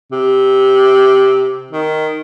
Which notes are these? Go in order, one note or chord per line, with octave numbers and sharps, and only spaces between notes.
C3
D#3